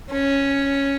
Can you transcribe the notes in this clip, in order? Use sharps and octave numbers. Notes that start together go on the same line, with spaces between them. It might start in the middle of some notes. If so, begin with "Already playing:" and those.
C#4